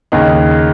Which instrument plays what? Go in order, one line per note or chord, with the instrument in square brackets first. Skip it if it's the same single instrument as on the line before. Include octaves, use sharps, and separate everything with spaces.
[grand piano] D#2 C#3 D#4